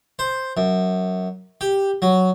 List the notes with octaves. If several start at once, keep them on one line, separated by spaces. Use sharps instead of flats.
C5
F#2
G4
F#3